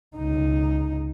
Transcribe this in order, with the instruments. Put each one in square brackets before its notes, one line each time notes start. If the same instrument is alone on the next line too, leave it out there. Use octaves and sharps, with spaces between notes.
[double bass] C#2 D#4